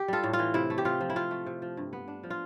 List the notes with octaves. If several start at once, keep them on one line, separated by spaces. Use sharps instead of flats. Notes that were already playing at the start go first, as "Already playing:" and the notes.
Already playing: G4
G3 F4 A4
A2
F4
E3
C3 E4
A3
G4
C3 F4
F3
E4
C3 F4
A3
C3
F3
G2
B3
D4
F3
F4